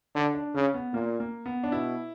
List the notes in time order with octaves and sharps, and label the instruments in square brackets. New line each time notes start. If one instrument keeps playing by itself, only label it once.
[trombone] D3 [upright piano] D4
[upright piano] D4
[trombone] C#3 [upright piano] C#4
[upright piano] B3
[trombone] A#2 [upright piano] A#3
[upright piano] A#3
B3
D4
[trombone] B2 [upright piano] E4